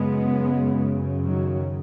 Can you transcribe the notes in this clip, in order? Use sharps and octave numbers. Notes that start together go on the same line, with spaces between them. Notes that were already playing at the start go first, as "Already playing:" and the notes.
Already playing: F#2 C#3 G#3 B3
D#3 F#3